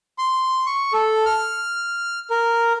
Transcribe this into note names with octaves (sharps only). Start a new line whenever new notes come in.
C6
C#6
A4
F6
A#4